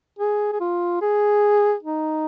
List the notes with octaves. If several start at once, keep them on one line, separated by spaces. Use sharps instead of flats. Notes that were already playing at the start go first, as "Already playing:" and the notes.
G#4
G#4
F4
G#4
D#4